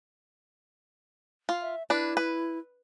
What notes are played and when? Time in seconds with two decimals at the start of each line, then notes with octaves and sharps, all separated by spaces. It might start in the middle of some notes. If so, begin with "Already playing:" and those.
1.49 F4
1.62 E5
1.90 D4 E4 B4
2.17 B4